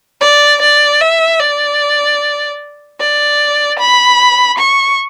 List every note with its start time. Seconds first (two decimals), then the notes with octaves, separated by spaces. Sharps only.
0.21 D5
0.62 D5
1.01 E5
1.40 D5
3.00 D5
3.79 B5
4.59 C#6